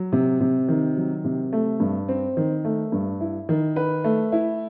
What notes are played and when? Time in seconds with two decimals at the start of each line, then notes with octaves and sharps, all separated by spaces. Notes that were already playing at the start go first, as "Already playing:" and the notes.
Already playing: F#3
0.12 C3
0.40 C3
0.68 D#3
0.96 F#3
1.24 C3
1.53 A3
1.80 G2
2.08 C4
2.37 D#3
2.65 A3
2.92 G2
3.21 E4
3.49 D#3
3.76 B4
4.04 A3
4.32 E4